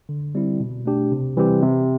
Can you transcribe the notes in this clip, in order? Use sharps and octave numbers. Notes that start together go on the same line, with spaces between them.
D3
G3 C4 E4
B2
A3 D4 G4
C3
E3 G3 C4 G4
C3